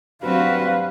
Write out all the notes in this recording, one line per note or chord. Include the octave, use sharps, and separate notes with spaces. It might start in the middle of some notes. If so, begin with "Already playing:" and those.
G2 F#3 C4 F#4 B4 F5